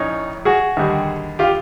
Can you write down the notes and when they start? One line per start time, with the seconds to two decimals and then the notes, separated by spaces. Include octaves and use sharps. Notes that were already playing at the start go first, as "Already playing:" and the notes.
Already playing: A#1 A2 C#4 D#4
0.45 F#4 G#4
0.77 D#2 D3 G3
1.39 F4 G4